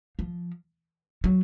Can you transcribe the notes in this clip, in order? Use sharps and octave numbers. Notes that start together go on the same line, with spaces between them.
F3
F#3